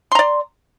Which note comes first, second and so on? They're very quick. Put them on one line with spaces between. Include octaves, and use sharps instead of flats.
C6 A#5 D5